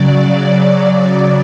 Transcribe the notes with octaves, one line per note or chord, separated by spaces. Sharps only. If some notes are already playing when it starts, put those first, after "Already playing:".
Already playing: C#3 F#3 D5
C#3 F#3